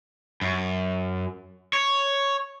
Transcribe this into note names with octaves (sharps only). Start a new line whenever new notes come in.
F#2
C#5